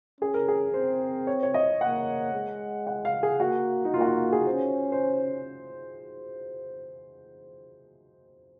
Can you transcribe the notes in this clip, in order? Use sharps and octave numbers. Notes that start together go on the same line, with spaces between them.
C#4 G#4
A#4
G#4
C4 C5
C#5
C#5
D#5
A#3 F#5
G#3
F#5
F5
G#4
A#3 F#4
D#4
A#3 F4
F#4
F4
G#4
C#4 C5
C5